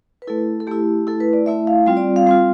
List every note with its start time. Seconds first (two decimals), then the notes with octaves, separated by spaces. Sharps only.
0.22 B4
0.27 A3 E4 A4
0.60 A4
0.67 A3 E4 G4
1.07 A3 E4 A4
1.20 B4
1.33 D5
1.46 A3 E4 E5
1.67 F5
1.86 G3 C4 F4 G5
1.97 D5
2.16 F5
2.27 G3 C4 F4 F5